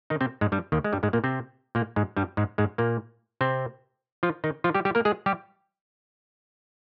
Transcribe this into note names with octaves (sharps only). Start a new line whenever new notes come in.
D#3 D#4
C3 C4
G#2 G#3
G2 G3
D#2 D#3
G#3
G2 G3
G#2 G#3
A#2 A#3
C3 C4
A#2 A#3
G#2 G#3
G2 G3
G#2 G#3
G#2 G#3
A#2 A#3
C3 C4
F3 F4
D#3 D#4
F3 F4
G3 G4
G3 G4
A#3 A#4
G#3 G#4
G3 G4